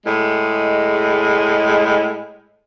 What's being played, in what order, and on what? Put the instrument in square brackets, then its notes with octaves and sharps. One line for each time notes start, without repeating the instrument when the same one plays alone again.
[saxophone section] A2 G#3